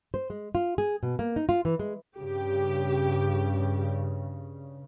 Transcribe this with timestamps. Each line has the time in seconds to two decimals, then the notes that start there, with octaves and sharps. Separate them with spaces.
0.14 C5
0.30 G#3
0.55 F4
0.78 G#4
1.03 B2
1.19 A#3
1.36 D#4
1.49 F4
1.65 E3
1.79 G#3
2.17 G2 C#3 G4